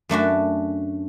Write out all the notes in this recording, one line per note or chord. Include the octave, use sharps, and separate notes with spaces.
F#2 A3 D4 F#4